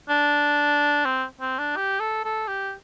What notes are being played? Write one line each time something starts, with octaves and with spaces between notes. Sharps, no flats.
D4
C4
C4
D4
G4
A4
A4
G4